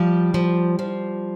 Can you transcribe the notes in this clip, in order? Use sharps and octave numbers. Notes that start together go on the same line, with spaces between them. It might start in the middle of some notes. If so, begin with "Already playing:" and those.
Already playing: F3 G3 G4
F3
F3